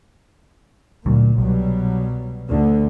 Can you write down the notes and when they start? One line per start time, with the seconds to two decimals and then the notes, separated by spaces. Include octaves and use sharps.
1.06 D2 A#2 F#3
1.38 C2 B2 F#3 G3
2.49 D2 D3